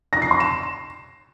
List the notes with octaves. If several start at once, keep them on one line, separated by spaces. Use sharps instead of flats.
A#6
C7
C6
E7